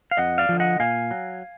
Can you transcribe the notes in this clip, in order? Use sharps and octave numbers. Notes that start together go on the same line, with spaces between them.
F5
F2 D#5 F#5
D5 F5
D3 F3
D#5 F#5
A#2 F5 G#5
F#3